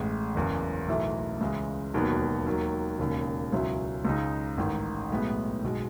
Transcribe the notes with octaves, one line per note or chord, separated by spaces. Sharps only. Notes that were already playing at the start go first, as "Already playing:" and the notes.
Already playing: A1 A2 G#3
F#1 E2 C#3
B1 A2 E3 A3 E4
C#2 C#3 E3 G#3
E1 D#2 D#3 F#3 B3
D#2 D#3 F#3
E1 D#2 C#3
C#2 B2 F#3 C#4 E4
C#2 C#3 G#3 D#4
A1 G#2 D#3
B1 A2 G#3 B3
B1 B2 G#3